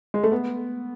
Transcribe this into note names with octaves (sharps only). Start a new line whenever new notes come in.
G#3
A3
B3